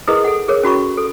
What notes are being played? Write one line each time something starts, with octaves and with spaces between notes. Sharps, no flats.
E4 G#4 A#4 B4 D#5 D#6
A4 F#5
G#4 A#4 C#5
C#4 F#4 B5 C#6
A4